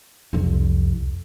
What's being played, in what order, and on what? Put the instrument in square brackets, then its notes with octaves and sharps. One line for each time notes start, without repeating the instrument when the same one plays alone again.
[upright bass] C2 F2